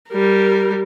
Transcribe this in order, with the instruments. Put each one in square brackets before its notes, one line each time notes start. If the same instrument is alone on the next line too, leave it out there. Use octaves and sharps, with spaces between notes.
[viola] G3 A#4